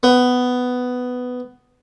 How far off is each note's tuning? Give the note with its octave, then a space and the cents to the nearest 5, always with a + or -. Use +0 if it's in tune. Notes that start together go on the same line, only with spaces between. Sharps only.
B3 +10